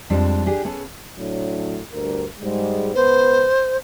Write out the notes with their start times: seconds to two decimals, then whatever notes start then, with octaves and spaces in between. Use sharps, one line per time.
0.10 F2 F3 G3 G#3 D4
0.46 D4 G4 G#4
0.65 B3 C#4 G#4 A4
1.17 A2 F#3 D4
1.92 D2 G2 A#4
2.40 G#2 G3 G#3
2.95 C#2 B3 B4 C5